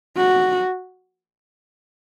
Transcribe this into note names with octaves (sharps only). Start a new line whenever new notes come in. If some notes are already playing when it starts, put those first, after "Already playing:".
F#4